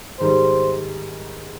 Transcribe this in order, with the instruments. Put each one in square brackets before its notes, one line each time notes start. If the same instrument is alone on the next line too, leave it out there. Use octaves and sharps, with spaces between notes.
[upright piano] G#2 D#3 G3 [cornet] C5